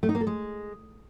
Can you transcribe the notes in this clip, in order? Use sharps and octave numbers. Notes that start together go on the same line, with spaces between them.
A3
D#4
A#3
A4
G#3